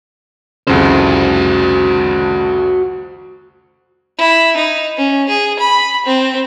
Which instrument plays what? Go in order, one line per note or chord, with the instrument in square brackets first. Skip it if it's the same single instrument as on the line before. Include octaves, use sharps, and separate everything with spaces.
[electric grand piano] C2 F2 C#3 [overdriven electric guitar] F#4 C5
[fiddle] E4
D#4
C#4
G#4
B5
C4